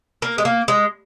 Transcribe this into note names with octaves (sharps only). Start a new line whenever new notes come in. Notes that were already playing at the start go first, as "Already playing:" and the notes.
A#3
G#3
A#3
G#3